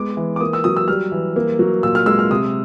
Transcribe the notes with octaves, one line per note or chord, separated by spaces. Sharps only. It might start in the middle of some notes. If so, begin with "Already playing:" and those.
Already playing: G#3 B3 D6
E3
D6
A#3 D#6
E6
F#3 D#6
E6
G3 F6
E3
A#3
F#3
A#2 E6
F6
G#3 E6
F6
C3 D#6